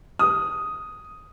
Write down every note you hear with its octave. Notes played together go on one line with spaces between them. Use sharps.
D#6